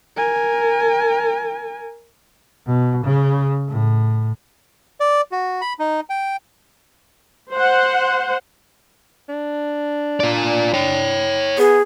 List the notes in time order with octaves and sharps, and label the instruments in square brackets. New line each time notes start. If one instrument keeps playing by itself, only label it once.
[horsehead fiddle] A#4 G#5
[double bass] B2
C#3
A2
[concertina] D5
F#4
B5
D#4
G5
[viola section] C5 F#5
[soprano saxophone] D4
[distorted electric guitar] F4 D5
C#5 G5
[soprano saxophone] B3 [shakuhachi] G#4